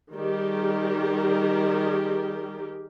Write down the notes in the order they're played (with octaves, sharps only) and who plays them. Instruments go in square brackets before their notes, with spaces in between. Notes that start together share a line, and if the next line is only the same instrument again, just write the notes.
[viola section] D#3 G3 G4 G#4 A#4